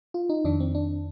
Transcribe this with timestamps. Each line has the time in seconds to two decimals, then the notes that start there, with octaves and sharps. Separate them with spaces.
0.14 F4
0.29 D#4
0.45 F2 D#3 D4
0.60 C4
0.75 D4